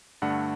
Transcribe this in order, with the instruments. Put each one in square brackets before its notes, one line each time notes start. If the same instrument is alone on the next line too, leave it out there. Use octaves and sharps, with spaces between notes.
[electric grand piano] G2 D3 A3 D4 F#5